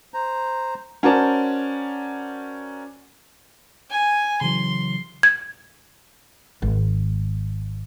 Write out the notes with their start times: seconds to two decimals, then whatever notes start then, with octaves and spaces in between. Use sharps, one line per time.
0.14 C5 A#5
1.03 C#4 F#4 A#4 C5 D5 A5
3.91 G#5
4.41 C#3 E3 F#3 C6
5.23 G#6
6.62 G#1